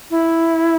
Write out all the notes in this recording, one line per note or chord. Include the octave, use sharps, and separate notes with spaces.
E4